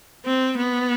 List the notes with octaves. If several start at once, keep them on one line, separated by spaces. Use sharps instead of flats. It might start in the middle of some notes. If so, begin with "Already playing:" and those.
C4
B3